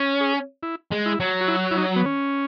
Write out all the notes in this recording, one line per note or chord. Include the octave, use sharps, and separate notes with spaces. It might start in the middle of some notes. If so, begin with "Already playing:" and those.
Already playing: C#4
G#4
E4
G#3
E4
F#3
F#4
E4
E4
D#4
B3
C#4